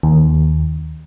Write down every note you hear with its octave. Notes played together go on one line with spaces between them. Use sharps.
D#2